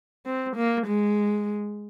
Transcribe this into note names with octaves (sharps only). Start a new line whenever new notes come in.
C4
A#3
G#3